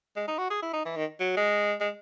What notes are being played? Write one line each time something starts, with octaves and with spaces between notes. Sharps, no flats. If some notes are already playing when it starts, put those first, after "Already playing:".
G#3
D#4
F#4
G#4
E4
D#4
E3
D#3
F#3
G#3
G#3